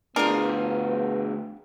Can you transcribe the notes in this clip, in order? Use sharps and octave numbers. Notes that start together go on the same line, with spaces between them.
D2 B3 D4 F4 G#4 A#4